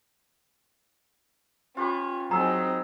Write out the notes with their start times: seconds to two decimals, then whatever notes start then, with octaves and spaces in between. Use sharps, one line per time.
1.77 C#4 F4 G4 B4
2.31 F#3 C4 D#4 G#4 A#5 E6